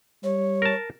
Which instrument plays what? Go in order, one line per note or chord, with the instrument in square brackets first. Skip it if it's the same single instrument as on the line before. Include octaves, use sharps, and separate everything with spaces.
[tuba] G3 [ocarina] C#5
[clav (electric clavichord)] A#4 A5